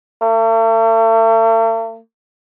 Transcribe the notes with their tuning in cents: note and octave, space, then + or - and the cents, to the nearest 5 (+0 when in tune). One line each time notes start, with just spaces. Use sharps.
A3 +45